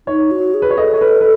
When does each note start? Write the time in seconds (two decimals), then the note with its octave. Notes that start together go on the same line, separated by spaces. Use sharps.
0.07 D#4 C#5
0.31 F#4
0.54 G#4
0.62 B4
0.71 C#5
0.77 A4 D#5
0.93 C#5
1.01 B4
1.21 B4